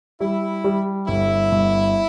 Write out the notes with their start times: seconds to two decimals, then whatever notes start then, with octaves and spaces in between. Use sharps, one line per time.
0.20 G3 E4
0.64 G3
1.08 G1 E4
1.52 G1